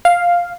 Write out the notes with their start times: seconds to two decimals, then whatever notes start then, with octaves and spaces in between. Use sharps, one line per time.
0.05 F5